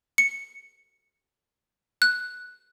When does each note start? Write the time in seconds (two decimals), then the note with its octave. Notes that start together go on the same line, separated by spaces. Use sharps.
0.18 C#7
2.02 F#6